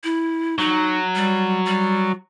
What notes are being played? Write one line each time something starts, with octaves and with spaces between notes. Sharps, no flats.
E4
F#3 D#4
G3
G3